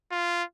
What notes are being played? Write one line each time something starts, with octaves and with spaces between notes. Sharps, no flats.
F4